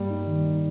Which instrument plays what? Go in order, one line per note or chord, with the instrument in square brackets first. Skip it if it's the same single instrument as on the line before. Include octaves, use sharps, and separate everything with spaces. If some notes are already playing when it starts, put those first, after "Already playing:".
Already playing: [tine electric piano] G2 A#3 [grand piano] G3
[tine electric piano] D#4
D#3
D#4